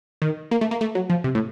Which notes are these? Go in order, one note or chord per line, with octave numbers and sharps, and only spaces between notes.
D#3
A#3
A3
A#3
A3
F#3
F3
C3
A2